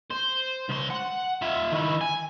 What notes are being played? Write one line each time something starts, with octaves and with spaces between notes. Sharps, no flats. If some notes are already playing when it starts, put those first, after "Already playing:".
C5
C#2 C6
F#5
F4 E5
D#3 E4
G#5